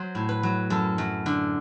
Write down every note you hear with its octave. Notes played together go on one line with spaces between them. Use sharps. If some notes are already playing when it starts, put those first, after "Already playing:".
Already playing: F#3 C5
A2
B4
F#3
F#2 A4
F#2
D3